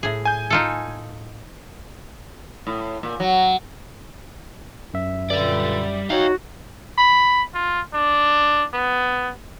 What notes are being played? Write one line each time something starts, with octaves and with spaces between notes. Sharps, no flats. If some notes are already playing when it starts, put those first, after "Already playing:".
A2 G#4
G#5 G6
D#4 F4 A4
A2
A#2
F#3
F#2 E5
G2 A#2 D3 G3 D5
D#4 F#4 C#5 F5 G5
B5
F4
D4
B3